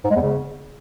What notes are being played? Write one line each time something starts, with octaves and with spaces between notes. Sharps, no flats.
G#2
G#3
E2
C#3